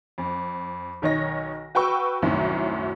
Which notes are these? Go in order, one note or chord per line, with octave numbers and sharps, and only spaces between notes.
F2
B1 D#3 C#5 D#5 A#6
F#4 B4 G5 C#6 E6
C2 F#2 A2 D#3 F#3 C4